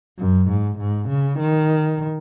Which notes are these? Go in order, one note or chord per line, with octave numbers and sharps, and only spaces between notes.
F#2
G#2
G#2
C#3
D#3